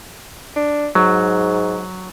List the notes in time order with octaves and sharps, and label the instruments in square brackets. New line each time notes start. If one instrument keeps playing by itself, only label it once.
[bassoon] D4
[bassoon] G#2 [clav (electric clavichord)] F#3